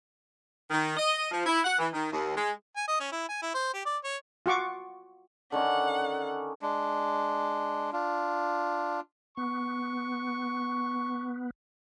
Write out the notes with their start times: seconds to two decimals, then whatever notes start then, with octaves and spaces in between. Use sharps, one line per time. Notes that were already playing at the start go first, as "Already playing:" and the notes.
0.71 D#3
0.97 D#5
1.31 F3
1.46 E4
1.64 F#5
1.79 E3
1.92 D#3
2.12 D#2
2.36 G#3
2.76 G#5
2.87 D#5
3.00 C#4
3.12 E4
3.29 G#5
3.42 E4
3.54 C5
3.73 G4
3.86 D5
4.04 C#5
4.46 F4 F#4 C#6 D6
5.52 D3 D#3 C#4 F#5
6.61 G#3 D4
7.93 D4 F4
9.37 B3 C#6